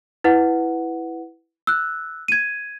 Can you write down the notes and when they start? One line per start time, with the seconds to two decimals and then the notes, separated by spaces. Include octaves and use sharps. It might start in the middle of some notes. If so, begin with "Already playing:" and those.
0.24 E4 B4 F#5
1.67 E6 F#6
2.28 G#6 D#7